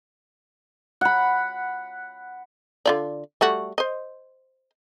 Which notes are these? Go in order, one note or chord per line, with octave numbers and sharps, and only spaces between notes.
F#5 B5
D3 F4 D5
G3 A3 F#4
C5 D#5